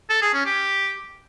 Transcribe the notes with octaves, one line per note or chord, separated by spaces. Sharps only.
A4
G#4
C#4
G4